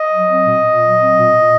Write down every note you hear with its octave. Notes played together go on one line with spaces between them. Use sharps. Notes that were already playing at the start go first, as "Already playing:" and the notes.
Already playing: D#5
F#3
C4
A#2
A#2
F#3
C4
A#2
A#2